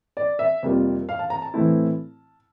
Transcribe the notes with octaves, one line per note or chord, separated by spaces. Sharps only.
D5
E5
F2 C3 G3 A#3 F4
F5
A5
A#5
A5
A2 E3 A3 C4 E4